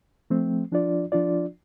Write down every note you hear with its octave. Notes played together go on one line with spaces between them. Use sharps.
F3 A3 C4
F3 D4 F4 D5
F3 D4 F4 D5